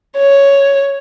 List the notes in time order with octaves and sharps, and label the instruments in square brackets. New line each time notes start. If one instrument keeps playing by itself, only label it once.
[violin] C#5